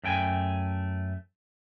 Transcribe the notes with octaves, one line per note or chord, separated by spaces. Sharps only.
F#2 A3 G5 G#5